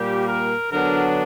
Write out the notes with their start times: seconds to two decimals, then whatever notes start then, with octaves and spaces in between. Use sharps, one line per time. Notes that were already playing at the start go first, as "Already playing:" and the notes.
Already playing: A#2 G3 A#3 G4
0.26 A#4
0.72 D3 F#3 B3 D4 A#4